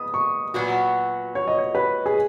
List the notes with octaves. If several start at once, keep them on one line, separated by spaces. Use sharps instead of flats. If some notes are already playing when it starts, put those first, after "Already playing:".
Already playing: B3 D#6
C#6
A#2 F#3 B3 F#4
C#5
D#5
C#5
B4
G#4